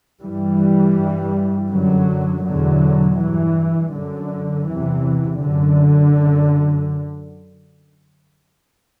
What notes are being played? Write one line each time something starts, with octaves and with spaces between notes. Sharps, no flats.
G2 E3 G3
G2
F#2 D3 F#3
E2 B2 D3 F#3
G2 E3
F#2 D3
E2 C3 E3
F#2 D3
F#2